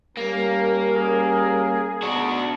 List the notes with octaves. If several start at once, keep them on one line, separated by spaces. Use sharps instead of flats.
G3 A#3 C#4 A#4
G#4
B2 D4 D#4 F#4